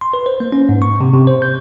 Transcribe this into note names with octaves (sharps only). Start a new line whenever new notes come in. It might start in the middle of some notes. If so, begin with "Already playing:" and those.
C6
B4
C5
A#3
C#4
G#2
C#6
C3
C3
C5
G6